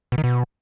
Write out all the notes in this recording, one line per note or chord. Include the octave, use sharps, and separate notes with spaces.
B2
D#3
B2